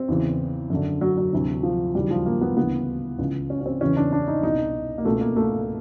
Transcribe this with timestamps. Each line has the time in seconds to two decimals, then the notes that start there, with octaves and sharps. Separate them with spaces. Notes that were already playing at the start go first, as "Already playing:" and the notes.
Already playing: C4
0.08 E2 C#3 E3
0.70 F#2 D3
1.01 F#3
1.18 F#3
1.33 D2 C3 E3
1.63 F3
1.95 D#2 C#3 E3 G3
2.03 F#3
2.11 F3
2.26 A#3
2.41 B3
2.57 D2 C#3 E3 B3
3.19 C#2 C#3 E3
3.50 C#4
3.61 C#4
3.66 C4
3.81 E2 C#3 E3 C#4
3.97 D4
4.13 D4
4.28 D#4
4.43 C2 B2 D#4
4.98 A#3
5.05 C#2 B2 A3
5.21 A#3
5.36 A3